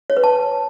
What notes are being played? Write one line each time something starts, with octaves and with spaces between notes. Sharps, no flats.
C#5
B4
A5